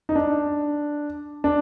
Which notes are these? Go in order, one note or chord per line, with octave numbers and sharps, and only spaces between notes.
D#4
D4
D4